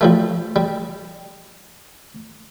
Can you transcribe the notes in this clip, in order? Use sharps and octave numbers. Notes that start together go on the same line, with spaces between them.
F3 G3 A3
G3